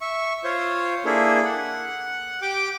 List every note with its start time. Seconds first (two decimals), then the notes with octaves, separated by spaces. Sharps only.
0.01 E5 C#6
0.44 F4 C5 C#5
1.05 A#3 D4 E4 G#4 A4
1.45 F#5
2.42 G4 G5 D6